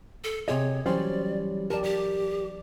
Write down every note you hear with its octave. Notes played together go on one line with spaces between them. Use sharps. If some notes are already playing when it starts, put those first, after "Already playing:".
A4
C3 G#4 C#5 D#5
E3 F#3 G3 C#4 C5 D5
G4 A#4 D5 A5
G4 D5